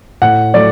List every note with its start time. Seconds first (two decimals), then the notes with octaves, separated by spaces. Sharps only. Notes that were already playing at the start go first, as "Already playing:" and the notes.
0.22 A2 F#5
0.54 F#3 A3 D5